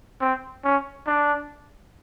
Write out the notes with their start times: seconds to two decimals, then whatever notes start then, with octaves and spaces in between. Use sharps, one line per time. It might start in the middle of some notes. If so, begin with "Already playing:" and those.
0.21 C4
0.64 C#4
1.07 D4